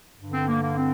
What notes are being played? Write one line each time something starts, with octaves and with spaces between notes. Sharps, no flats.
G2 D3
C4
A#3
A#3
C4